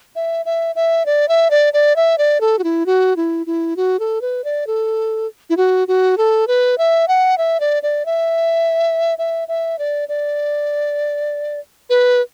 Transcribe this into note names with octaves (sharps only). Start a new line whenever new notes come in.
E5
E5
E5
D5
E5
D5
D5
E5
D5
A4
F#4
E4
F#4
E4
E4
F#4
A4
B4
D5
A4
E4
F#4
F#4
A4
B4
E5
F#5
E5
D5
D5
E5
E5
E5
D5
D5
B4